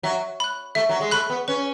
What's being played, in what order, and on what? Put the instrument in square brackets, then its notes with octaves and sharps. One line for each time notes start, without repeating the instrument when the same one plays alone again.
[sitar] F#3 [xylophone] E5
[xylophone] B5 F#6
[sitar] A3 [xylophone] E5
[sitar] F#3
G#3
[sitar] A3 [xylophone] B5 F#6
[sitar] B3
[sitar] C#4 [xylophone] B4